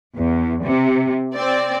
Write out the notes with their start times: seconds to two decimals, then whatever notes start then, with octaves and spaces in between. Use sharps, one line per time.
0.16 E2
0.63 C3
1.36 C4 D5